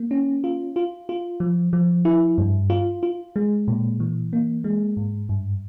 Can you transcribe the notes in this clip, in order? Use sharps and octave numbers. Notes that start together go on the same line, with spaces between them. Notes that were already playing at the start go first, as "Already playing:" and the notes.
Already playing: A#3
C#4
F4
F4
F4
F3
F3
E4
G2
F4
F4
G#3
A#2
E3
A#3
G#3
G#2
G2